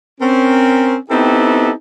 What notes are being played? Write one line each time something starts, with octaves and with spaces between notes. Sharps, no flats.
C4 C#4 A#4
B3 C4 D#4 E4 G4 A4